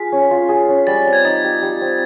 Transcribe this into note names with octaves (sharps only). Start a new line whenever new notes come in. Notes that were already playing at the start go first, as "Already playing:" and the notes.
Already playing: F4 G#4 B6
C#4
F4
G#4
C#4
G3 A6
C4
G#6
D#4 A6
G4
G3
C4